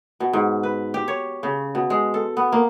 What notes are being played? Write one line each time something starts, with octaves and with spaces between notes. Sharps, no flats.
B2
G#2
B4
G4
C#5
C#3
B2
G#3
A4
B3
A#3